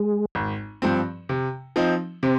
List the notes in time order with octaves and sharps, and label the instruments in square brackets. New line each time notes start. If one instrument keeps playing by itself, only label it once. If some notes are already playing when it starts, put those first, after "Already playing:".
Already playing: [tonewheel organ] G#3
[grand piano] G#1
G2 F3 C4
C3
F3 C4 D#4
[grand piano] C3 [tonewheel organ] C4